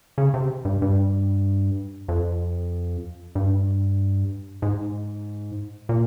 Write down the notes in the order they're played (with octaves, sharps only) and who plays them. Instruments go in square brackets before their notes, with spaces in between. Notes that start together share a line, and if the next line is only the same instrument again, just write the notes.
[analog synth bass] C#3
C3
G2
G2
F2
G2
G#2
A#2